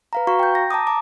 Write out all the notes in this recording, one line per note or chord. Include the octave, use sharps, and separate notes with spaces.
B4 F5 A#5
F#4 F5 A#5 C#6
G5 G6
A#6
A5 A#5 D6 D#6
A5 A#5 D6